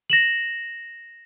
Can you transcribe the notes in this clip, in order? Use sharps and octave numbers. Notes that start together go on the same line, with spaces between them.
A#6 E7 F#7